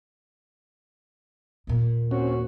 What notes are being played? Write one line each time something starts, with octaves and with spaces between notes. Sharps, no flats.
D#2 A#2
C4 C#4 F#4